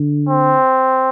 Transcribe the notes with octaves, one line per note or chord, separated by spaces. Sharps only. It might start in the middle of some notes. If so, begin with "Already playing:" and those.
Already playing: D3
C4